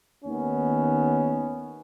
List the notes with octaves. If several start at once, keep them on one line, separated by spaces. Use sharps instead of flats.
D#2 D#3 B3 C#4